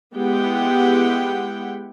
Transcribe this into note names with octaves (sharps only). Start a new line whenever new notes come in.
G#3 B3 E4 G4 F#5 G5